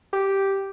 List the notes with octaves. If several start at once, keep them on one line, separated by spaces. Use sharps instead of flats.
G4